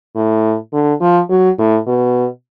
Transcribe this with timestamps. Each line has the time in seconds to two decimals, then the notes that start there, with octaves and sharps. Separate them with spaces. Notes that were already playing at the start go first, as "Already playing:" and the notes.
0.16 A2
0.73 D3
1.01 F3
1.30 F#3
1.59 A2
1.87 B2